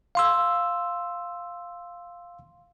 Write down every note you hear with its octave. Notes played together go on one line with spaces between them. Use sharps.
F5 C6 E6